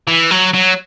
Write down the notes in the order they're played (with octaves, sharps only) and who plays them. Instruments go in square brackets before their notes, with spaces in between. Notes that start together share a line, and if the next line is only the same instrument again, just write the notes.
[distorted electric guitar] E3
F#3
F#3